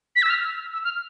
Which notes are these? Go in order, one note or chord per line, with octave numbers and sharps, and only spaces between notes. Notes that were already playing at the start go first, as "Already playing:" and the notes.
B6
E6
F6
E6
E6
F6